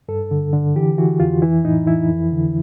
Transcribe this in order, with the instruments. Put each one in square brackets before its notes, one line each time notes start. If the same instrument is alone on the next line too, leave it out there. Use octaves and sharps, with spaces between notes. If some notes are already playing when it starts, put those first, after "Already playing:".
[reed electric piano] G2 A4
D3
D3
E3 G4
E3 F#4
F2 F4
E3 E4
A2 D#4
E3 E4
F2
D3